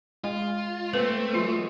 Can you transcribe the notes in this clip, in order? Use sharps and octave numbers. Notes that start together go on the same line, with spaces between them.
G#3 F4
A3 A#3 C4 B4
E3 F#3 G#3 F4